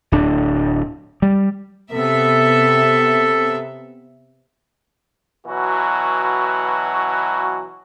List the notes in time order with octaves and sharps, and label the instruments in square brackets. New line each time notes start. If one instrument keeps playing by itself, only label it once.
[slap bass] D1 D4
G3
[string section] C3 B3 E5 [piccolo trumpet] A4
[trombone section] B2 E3 F#3 F#4